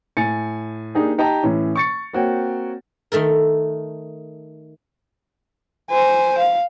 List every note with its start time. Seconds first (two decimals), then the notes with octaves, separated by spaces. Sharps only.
0.17 A2 G#5 A6 C#7
0.95 A#3 D4 D#4 G4 G#4
1.18 D#4 G4 D#5 G5 A5 A#5
1.43 A2 E3 C#4
1.76 C#6 A6 C#7
2.13 A#3 C4 F#4 C#5 G5
3.12 D#3 A3 A4 A#4
5.91 C5 G#5
6.38 F5